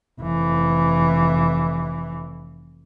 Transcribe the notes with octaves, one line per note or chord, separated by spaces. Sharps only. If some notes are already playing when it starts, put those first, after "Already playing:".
F1 E3